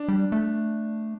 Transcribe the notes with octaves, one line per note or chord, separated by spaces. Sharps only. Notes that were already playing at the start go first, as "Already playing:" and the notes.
Already playing: D4
G3
A3